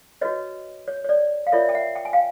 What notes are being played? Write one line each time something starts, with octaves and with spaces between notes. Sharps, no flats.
F#4 B4 C#5 D#5
C#5
C#5
D5
F5
F4 A#4 C#5 D5 E5
G5
E5 F#5
G5
G#5
F5 G5